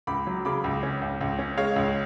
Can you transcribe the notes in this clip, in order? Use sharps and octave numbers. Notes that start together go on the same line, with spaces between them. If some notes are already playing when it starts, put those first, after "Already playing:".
C#2 B5 D6
F#3
C#3 B5 D6
C#2
C#4
C#2
C#2
C#4
G#3 C#5 F5
C#2